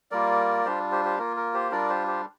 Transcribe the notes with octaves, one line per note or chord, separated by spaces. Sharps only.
G3 A#3 F4 A#4 D5
G3 D4 F4 G4 C5
G4 C5
G4 C5
A#3 F4 A#4
A#4
G4 C5
G3 D4 F4 A#4 D5
G4 C5
G4 C5